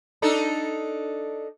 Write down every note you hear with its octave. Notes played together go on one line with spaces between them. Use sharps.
D4 D#4 A4